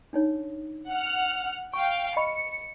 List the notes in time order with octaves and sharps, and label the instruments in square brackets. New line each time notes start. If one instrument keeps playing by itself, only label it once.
[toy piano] D4 D#4 C#5
[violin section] F#5 F6
[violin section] F5 G5 [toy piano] C#6
[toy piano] D#5 B5 C#6 [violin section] C#7